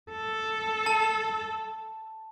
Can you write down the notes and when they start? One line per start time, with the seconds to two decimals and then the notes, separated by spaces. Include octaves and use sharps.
0.12 A4
0.86 A5